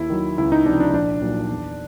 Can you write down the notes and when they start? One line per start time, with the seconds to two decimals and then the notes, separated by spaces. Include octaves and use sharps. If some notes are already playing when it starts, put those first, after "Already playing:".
Already playing: D#2 E4
0.10 D#3 F#3
0.38 C#2 E4
0.52 D#4
0.66 C3 F3 D4
0.80 D4
0.93 A#1 D4
1.22 A#2 F#3
1.50 E2